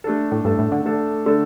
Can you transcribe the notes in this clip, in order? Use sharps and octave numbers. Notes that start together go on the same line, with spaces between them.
A3 D4 A4
A2
G2 A3 D4 A4
A2
D3
A3 D4 A4
D3 A3 D4 A4